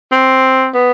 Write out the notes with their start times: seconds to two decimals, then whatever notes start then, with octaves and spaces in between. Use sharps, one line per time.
0.11 C4
0.74 B3